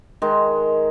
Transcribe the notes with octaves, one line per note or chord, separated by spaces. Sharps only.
D#3 G#3